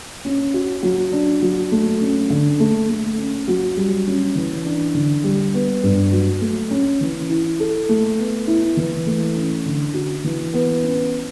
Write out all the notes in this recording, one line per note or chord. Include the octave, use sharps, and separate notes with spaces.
C#4
F#4
F#3
D4
F#3
A3
C#4
D3
A3
A3
C#4
F#3
G3
C#4
E3
D4
D3
G3
B3
G2
F#3
A3
C#4
E3
E4
A4
A3
B3
E4
E3
A3
C#4
D3
F#4
E3
B3
C#4